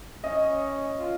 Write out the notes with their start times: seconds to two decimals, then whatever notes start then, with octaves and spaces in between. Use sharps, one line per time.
0.24 C#4 D#5
0.99 F4